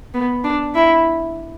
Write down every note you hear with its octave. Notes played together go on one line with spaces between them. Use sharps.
B3
D4
E4